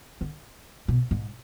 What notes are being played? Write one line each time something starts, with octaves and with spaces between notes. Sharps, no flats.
D3
B2
G#2